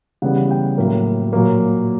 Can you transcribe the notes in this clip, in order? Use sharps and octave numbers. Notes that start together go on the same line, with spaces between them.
C#3 E3 G3 B3 F#5
G5
A2 F#3 A#3
A#2 F#3 A#3